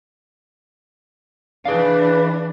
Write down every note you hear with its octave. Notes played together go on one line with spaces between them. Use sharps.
E3 D4 G#4 B4 F5